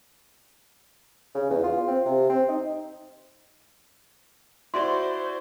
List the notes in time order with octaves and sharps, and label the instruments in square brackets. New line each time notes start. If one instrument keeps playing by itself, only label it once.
[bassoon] C#3
E2
F4
C4
C3
C4
D#4
[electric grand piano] E4 F#4 D5 [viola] C5 [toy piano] C6